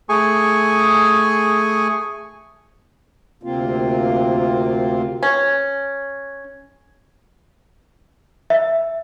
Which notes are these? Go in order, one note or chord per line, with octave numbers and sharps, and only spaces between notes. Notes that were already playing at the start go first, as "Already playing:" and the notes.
A3 G#4 G#5 C#6
D2 C3 A#3 C4 F4
C#4
E5